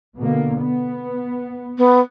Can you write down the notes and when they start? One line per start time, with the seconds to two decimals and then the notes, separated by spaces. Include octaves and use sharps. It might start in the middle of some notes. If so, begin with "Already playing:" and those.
0.17 B2 D3 A#3
0.60 B3
1.78 B3